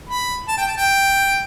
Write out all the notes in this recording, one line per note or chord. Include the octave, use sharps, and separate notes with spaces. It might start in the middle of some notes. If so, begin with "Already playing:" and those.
B5
A5
G5
A5
G5